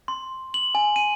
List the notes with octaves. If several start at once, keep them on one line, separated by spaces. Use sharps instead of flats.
C6
F#7
G#5
D#7